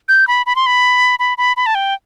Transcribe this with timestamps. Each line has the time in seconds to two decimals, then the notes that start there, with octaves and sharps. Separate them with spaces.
0.09 G6
0.28 B5
0.46 B5
0.56 C6
0.66 B5
1.19 B5
1.38 B5
1.57 B5
1.66 A5
1.75 G5